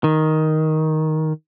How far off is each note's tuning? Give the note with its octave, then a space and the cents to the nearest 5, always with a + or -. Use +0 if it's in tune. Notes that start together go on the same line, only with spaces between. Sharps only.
D#3 +5